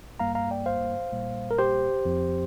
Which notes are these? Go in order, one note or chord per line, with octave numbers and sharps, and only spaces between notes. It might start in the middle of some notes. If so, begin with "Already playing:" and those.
G2 G3 A#3 F5 A#5
F5 A#5
D5 G5
C5 F5
A#2 G3 A#3
A#4
G4 C5
F2 F3 C4